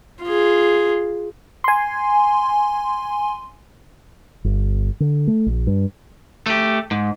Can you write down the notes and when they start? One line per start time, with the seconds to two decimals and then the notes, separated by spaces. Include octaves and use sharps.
0.23 F4 G#4
1.64 G#5 C6
4.44 G1
5.00 D3
5.27 A3
5.46 A#1
5.67 G2
6.46 A3 G4
6.91 G#2